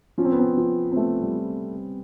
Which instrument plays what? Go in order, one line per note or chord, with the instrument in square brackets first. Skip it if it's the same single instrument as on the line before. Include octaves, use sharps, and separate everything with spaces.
[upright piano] F3 [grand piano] C#4
[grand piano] C4
B3
C4
[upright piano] F3
[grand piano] C4
[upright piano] A3 [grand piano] B3
[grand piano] G3